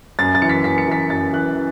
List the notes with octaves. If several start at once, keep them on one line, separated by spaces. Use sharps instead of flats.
F#2 A6
A6
E3 C#7
B6
F#2 B6
C#7
E3 B6
F#2 A6
E3 F#6